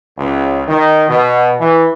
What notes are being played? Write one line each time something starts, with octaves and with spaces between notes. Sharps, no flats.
C#2
D#3
B2
E3